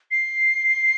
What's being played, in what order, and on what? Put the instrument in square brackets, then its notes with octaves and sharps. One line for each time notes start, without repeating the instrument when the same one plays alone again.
[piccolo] C7